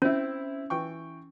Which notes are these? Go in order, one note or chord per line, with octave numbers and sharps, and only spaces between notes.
C4 C#4 E4
E3 G5 C#6